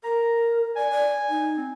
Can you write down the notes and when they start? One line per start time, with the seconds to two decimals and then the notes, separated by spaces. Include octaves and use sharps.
0.04 A#4 A#5
0.76 D5 G#5
0.91 D5
1.30 D#4
1.57 C4